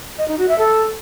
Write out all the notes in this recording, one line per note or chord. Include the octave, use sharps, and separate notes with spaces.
D#5
D#4
F#4
E5
A4